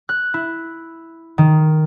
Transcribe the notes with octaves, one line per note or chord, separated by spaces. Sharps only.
F#6
E4
D#3